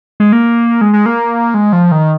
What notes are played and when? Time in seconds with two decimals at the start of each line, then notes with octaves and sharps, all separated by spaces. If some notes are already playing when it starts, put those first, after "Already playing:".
0.20 G#3
0.33 A#3
0.81 G#3
0.93 G#3
1.06 A#3
1.54 G#3
1.73 F3
1.92 D#3